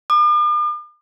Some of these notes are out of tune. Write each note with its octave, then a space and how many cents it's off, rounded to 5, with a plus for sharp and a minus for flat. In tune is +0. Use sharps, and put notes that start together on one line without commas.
D6 +45